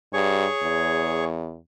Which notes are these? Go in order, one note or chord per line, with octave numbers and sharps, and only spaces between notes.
G2 G#4 C#5 C#6
E2